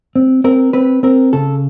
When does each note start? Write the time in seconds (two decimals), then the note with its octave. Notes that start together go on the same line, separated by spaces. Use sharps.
0.16 C4
0.44 C4 A#4
0.73 C4 B4
1.03 C4 A#4
1.33 C#3 A4